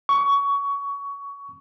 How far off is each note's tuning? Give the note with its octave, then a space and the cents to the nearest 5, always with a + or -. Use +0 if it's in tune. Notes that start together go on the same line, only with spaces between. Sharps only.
C#6 +20